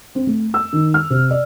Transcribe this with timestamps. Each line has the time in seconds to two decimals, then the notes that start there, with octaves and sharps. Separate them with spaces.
0.15 C4
0.27 A3
0.54 E6
0.73 D#3
0.94 F6
1.10 C3
1.31 D5